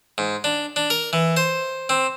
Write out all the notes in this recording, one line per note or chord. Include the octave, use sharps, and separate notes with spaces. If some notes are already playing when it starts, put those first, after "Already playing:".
G#2
D4
D4
A#4
E3
C5
C4